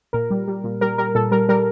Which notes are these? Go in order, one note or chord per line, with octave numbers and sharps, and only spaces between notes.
A#2 A#4
G3
G3
A#2
G3 A#4
G3 A#4
A#2 A4
G3 A#4
G3 A#4